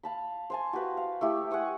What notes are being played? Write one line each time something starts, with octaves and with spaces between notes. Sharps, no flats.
F5 A5 B5
C5 G#5 A5
F#4 G4 B4 F5
F5
A3 E4 G4
F#5 G#5 C#6 D#6